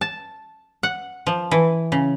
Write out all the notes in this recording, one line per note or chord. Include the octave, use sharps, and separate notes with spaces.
A5
F#5
F3
E3
C#3